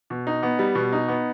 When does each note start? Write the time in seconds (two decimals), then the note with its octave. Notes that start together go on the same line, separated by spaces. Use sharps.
0.10 B2
0.27 D#4
0.43 B3
0.59 G3
0.75 B2
0.92 D#4
1.08 B3